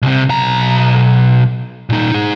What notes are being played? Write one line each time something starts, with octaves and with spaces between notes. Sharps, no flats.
C2 C3
B1 A#5
A#2 D#4
D#4 G#4